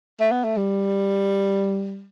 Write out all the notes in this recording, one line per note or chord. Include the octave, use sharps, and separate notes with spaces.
A3
B3
A3
G3